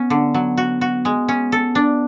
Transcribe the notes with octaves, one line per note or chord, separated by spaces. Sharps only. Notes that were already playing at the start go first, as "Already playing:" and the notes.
Already playing: B3 C#4
D3
F#3
F#4
F#4
G#3
C#4
A4
D4